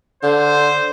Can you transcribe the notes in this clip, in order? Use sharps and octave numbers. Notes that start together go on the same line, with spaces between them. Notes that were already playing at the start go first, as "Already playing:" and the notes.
D3 C5